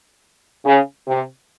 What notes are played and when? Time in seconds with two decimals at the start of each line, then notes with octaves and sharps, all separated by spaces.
0.65 C#3
1.07 C3